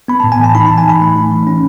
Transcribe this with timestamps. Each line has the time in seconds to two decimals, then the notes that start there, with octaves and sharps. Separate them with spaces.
0.08 B3 B5
0.20 A2 A5
0.32 G#5
0.39 E3 A5
0.55 D#4 B5
0.66 E3 A5
0.78 G#5
0.85 A2 B5
1.01 A3
1.16 D#4
1.31 E3
1.47 C#4